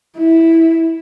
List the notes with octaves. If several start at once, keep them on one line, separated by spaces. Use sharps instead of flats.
E4